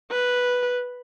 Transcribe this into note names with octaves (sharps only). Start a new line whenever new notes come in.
B4